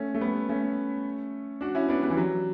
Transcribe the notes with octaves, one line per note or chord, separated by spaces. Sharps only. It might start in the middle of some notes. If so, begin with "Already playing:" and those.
Already playing: A3 C#4
A3
G3 B3
A3 C#4
D4 F#4
C#4 E4
B3 D4
G3 B3
E3
F#3